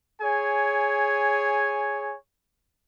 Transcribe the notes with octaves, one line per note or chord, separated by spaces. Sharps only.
G#4 C#5 G#5